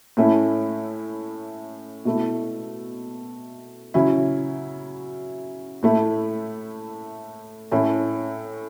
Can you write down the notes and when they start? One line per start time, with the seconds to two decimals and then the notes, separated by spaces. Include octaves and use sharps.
0.17 A2 A3 C#4 E4
2.05 B2 A3 E4
3.94 C#3 F#3 C#4 E4
5.83 A2 A3 E4
7.71 A2 A3 C#4 E4